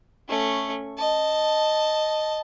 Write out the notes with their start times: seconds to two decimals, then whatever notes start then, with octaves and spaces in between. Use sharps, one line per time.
0.29 A3 C#4
0.98 D#5 A5